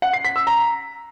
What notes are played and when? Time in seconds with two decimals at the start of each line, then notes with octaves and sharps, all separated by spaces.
0.02 F#5
0.13 C7
0.25 B6
0.36 E6
0.47 A#5